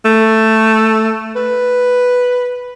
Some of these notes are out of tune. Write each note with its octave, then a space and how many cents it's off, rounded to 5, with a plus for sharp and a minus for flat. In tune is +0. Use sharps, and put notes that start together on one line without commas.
A3 +5
B4 +0